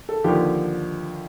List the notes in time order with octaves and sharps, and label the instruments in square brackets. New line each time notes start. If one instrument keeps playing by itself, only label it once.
[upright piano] A4
D#2 D3 F3 G4